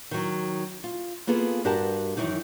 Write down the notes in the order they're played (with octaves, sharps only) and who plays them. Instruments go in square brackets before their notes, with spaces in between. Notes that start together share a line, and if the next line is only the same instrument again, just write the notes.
[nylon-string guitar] D#3 F#3
F4
A#3 B3 F4 G#4 A4
G2 F#4 G4 A#4 A5
F#2 C3 D#3 E3 D#4